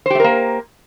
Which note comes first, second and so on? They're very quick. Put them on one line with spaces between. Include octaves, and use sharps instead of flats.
C5 G4 A3 A#4 A#3